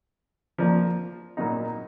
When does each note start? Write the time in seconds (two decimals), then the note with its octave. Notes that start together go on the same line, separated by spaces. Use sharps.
0.58 F3 A#3 D4 F4
1.37 A#2 F#3 B3 D#4